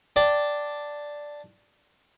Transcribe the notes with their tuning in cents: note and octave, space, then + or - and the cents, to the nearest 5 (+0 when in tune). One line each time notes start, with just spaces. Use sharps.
D4 +0 D5 +0 G5 +0